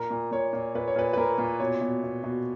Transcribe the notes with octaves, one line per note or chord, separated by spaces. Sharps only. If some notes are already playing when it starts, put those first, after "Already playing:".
Already playing: A#2 A#4
A#2
A#2 C#5
A#2
A#2 B4
C#5
A#2 B4
B4
A#2 A#4
A#2
B2 C#5
B2
B2
B2